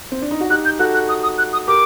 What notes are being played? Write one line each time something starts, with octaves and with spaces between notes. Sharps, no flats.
C4
D4
D#4
F#4
D#4 G4 F#6
G6
F#4 A4 F#6
F#6
D#6
D#6
F#6
D#6
G4 A#4 D6